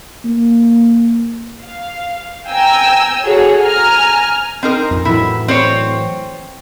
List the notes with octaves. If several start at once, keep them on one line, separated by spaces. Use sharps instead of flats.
A#3
F5
G5 G#5 A#5 E6
F#4 G#4 A4 C#5
G#5 A#5 F6
C4 D#4 A#4
F2
A2 E3 F#3 E4
C4 C5 C#5